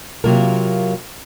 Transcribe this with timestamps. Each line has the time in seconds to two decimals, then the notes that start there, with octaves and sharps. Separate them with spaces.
0.24 C3 F#3 A#3 F4 A#4